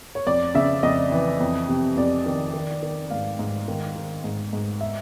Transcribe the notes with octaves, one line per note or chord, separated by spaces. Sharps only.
C#5
F2 D5
C#3 E5
F2 D#5
E3
F2
C3
F2 D5
D#3
D#3
D#3
G#2 F5
G#2
D#3
D#3
G#2
G#2
E5